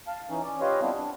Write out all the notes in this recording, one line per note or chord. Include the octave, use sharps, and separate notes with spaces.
F5 A5
E3 C#4 D#4
C#4 D5
F4 G4 B4 C#5 D#5 F5
G3 B3 C4 D4 E4
D4